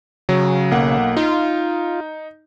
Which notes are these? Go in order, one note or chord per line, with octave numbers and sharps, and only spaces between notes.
C#3 F#3
B1 A#3 F#5
D#4 F4